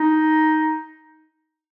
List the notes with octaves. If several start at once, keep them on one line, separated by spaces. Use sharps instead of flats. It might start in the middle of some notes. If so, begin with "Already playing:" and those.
Already playing: D#4